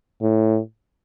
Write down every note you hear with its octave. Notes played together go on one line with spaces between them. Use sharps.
A2